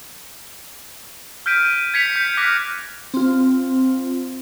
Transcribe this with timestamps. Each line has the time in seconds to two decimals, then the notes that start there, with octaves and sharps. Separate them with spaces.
1.46 F6 G6 B6 D7 D#7
1.65 D#7
1.94 G#6 B6 C#7 F7
2.16 G6 B6
2.37 D6 F6 F#6 A#6 B6
3.14 C4 F4